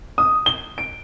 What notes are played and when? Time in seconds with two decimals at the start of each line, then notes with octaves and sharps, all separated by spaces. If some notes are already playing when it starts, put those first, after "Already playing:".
0.18 D#6
0.46 G7
0.78 D7